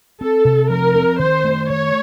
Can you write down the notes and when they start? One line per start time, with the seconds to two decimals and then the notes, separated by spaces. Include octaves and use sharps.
0.21 C4 A4
0.45 C3
0.70 F3 A#4
0.95 C4
1.19 D#3 C5
1.44 A3
1.69 D#3 C#5